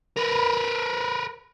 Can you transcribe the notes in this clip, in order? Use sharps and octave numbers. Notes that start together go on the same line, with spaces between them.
A#4 B4